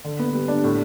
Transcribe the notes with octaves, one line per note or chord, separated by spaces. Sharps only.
D3
B3
G3
D4
A2